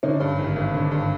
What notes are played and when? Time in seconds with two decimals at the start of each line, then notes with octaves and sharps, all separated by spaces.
0.03 D3 C#4 D#4
0.20 G2
0.39 G#1
0.56 G#1
0.74 D3
0.91 G2